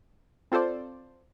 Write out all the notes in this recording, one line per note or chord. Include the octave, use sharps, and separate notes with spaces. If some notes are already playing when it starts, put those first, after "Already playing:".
C4 F4 A4 C5 D5